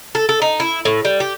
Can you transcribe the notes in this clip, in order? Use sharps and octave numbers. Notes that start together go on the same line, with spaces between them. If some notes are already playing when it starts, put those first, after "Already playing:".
A4
A4
D#4
E4
A2
G3
G4